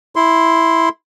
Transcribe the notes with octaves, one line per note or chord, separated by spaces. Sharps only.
E4 C6